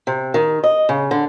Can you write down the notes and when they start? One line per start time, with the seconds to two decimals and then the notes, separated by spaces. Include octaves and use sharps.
0.07 C3
0.34 D#3
0.64 D#5
0.89 C#3
1.11 D3